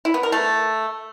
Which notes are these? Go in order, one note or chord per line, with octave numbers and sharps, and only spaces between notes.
E4
B3
A#4
A3